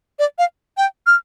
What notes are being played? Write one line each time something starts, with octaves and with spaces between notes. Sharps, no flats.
D5
F5
G5
F6